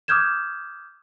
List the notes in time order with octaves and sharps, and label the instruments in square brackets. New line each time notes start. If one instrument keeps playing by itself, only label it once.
[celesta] D6 D#6 F6 G6 G#6 E7